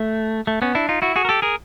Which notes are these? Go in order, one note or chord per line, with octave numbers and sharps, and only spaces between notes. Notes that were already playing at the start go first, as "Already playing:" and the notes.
Already playing: A3
A3
B3 C#4
D4 E4
D#4 F4
E4 F#4
F#4 G#4
A#4
G4 A4
G#4 A#4